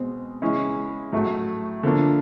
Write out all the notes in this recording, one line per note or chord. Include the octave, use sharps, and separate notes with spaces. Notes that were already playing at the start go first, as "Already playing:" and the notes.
Already playing: B2 G#3 C4
C#3 E3 G#3 C#4 E4
A2 F#3 A3
D3 F3 A#3 D4